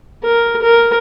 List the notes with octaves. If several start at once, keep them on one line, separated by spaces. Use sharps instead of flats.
A#4
A#4